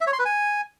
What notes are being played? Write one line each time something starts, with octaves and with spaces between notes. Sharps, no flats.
E5
C#5
C6
B4
G#5